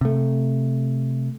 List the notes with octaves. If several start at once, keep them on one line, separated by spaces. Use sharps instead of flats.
C3 A3